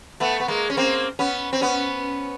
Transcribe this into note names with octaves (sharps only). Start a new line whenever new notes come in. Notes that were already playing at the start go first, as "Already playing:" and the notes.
A3 B3
B3
G#3 A#3
C#4
A#3 C4
B3 C#4
C4
B3 C#4